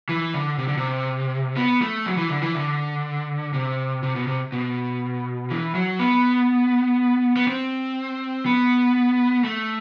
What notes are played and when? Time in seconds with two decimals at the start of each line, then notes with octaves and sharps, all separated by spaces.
0.09 E3
0.34 D3
0.58 C3
0.68 D3
0.77 C3
1.57 B3
1.82 A3
2.06 F#3
2.17 E3
2.30 D3
2.42 E3
2.55 D3
3.54 C3
4.03 C3
4.15 B2
4.27 C3
4.52 B2
5.50 E3
5.75 F#3
5.99 B3
7.36 B3
7.47 C4
8.46 B3
9.44 A3